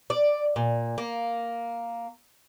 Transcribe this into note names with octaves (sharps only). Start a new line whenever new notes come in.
D5
A#2
A#3